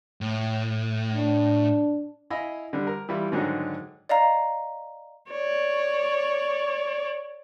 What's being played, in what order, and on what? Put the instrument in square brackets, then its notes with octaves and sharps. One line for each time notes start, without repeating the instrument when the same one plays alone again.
[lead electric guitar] A2
[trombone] D4
[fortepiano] E4 D#5 F5 G#5 B5
D3 G3
A#4
E3 G3 E4 F4
G#2 D3 D#3 F#3 G#3 D#4
[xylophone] D5 D#5 F5 A#5
[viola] C#5 D5